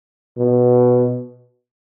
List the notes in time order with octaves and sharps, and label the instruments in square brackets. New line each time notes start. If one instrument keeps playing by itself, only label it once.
[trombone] B2